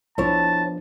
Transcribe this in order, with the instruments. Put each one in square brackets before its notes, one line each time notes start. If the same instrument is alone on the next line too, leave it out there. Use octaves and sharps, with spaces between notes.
[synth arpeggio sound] C2 [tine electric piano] F3 B3 D4 [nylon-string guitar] E4 C#5 [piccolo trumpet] A5